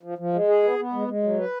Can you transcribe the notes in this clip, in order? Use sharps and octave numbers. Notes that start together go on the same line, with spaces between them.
F3
F3
G#3
G#4
B3
B3
G#3
G#3
F#3
B4